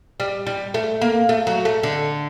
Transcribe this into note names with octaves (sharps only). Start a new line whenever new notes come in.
G3
G3
A3
A#3
A3
F#3
A3
D3